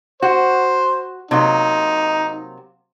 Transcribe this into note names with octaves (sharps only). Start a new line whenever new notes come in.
F#4 C5
C3 F#3 A#3 D#4